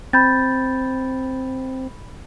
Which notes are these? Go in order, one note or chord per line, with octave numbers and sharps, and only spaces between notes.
C4 B5 G6 A6